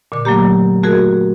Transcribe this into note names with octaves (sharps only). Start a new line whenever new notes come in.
A#2 D3 D6
F#3 A3 A#3 G4
A3 F#4 G#4 A#4